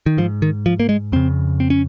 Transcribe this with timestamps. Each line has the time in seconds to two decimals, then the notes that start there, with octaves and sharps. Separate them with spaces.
0.06 D#3
0.18 G#2 F3
0.42 D#3
0.66 F3
0.80 A#3
0.89 G#3
1.12 F2 C#3 C4
1.60 C4
1.70 C#4